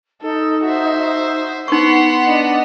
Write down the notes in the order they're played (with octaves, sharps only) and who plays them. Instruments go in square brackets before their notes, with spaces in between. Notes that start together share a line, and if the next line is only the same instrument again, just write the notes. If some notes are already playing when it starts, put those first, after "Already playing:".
[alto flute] D#4 [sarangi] A4
[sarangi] F#4 [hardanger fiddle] C5 E5
[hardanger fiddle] B3 F#5 [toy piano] D#4 C#6 [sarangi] C6
[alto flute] D4 [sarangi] D#5